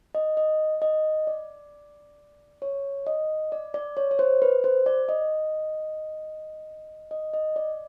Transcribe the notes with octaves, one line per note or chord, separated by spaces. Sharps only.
D#5
D#5
D#5
D5
C#5
D#5
D5
D5
C#5
C#5
C5
B4
C5
D5
D#5
D#5
D#5
D5